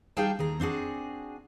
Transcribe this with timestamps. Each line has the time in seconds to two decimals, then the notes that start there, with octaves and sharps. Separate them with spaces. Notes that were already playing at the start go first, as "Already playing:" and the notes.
0.17 G3 D#4 G#4 F5 G5 A5
0.39 D#2 G#4 A#5
0.60 C4 D4 F#4 G#4